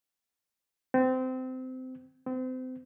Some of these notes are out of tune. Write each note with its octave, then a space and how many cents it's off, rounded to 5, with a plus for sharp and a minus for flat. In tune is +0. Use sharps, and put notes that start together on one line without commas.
C4 -25
C4 -35